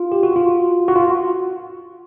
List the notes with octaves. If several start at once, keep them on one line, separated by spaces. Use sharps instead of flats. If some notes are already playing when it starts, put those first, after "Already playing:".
Already playing: F4
G4
F#4
F4
F#4
F4